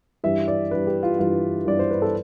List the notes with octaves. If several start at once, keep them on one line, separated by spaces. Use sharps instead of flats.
G2 E3 G3 E5
D5
G2 E3 G3 B4
G4
F4
G2 E3 G3 F4
G2 E3 G3 D5
C5
B4
A4